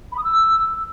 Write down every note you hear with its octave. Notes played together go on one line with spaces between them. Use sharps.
B5
D#6
E6